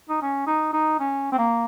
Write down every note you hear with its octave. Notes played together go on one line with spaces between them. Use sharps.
D#4
C#4
D#4
D#4
C#4
C4
A#3